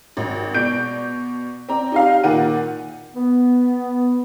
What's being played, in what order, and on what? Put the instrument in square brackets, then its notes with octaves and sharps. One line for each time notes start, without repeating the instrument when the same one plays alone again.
[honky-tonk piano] G#1
B2 D5 G6 D7
C4 D5 A#5
D#4 G4 F5
A#2 D#3 F#5 D#7
[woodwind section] B3